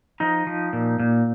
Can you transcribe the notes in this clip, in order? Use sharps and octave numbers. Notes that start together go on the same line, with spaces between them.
F3 D#4 D#5
F3
A#2
A#2